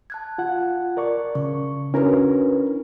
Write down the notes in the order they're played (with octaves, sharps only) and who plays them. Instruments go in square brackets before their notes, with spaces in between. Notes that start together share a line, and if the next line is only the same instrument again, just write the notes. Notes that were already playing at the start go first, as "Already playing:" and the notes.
[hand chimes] A5 F#6 G#6
[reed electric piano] F4 F#5
A#4 D5 C#6
[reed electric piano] C#3 [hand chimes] C#6
[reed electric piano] C#4 E4 A#4 [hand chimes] D4 F#4 B4